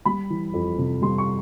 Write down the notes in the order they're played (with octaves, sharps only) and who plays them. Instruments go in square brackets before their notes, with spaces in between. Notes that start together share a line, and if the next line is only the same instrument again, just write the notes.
[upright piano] G3 B5
E3
F2
C3
G3 C6
C#6